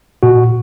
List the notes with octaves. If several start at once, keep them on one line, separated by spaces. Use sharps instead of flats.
A#2 F#4